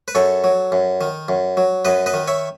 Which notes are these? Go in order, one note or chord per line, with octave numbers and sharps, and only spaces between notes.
B4
F#2 A4 C#5
F#3
F#2
D#3
F#2
F#3
F#2 B4 D#5
B4 D#5
D#3
C#5 E5